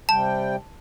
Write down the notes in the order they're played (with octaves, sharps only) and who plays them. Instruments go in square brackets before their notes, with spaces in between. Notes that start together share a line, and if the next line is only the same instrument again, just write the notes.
[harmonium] C3 G3 G5 [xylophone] A5